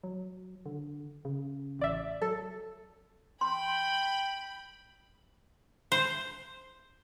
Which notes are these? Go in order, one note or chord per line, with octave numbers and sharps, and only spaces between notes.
F#3
D3
C#3
A1 D5 E5
F#3 A4
G5 B5 C6
C5